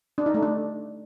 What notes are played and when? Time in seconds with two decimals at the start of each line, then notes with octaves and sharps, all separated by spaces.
0.18 D4
0.26 D#4
0.34 A3
0.43 D4